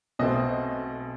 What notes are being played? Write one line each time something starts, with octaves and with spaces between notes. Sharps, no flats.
B1 B2 A3 C4 D#5